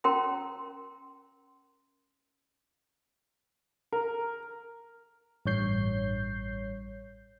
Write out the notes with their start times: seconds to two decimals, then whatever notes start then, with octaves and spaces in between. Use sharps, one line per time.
0.04 C#4 A#4 G5 A#5 C6
3.93 A#4
5.46 A1 G2 C#5 G6 C7